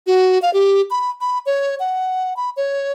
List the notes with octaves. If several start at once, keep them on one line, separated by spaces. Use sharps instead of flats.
F#4
F5
G4
B5
B5
C#5
F#5
B5
C#5